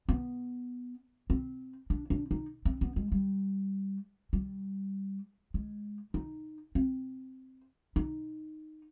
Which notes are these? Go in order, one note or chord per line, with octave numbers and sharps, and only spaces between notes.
B3
C4
D4
D4
D#4
C4
B3
G#3
G3
G3
G#3
D#4
C4
D#4